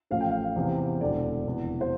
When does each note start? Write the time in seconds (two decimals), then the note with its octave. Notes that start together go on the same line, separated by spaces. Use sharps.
0.11 A1 A2 F3 F5
0.20 G5
0.31 F5
0.56 E2 C3 E3
1.01 E1 E2 D3 D5
1.45 F1 E2 E3
1.81 C5